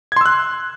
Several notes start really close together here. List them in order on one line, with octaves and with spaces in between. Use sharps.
G#6 C6 E6 F#6